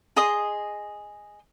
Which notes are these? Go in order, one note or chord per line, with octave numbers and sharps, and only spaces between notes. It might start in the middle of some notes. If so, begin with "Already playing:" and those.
G#4 D#5 C6 D#6